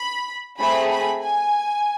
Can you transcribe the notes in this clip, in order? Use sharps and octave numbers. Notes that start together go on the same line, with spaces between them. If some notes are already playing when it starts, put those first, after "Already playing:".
Already playing: B5
A3 C4 G#4 B5
B5
G#5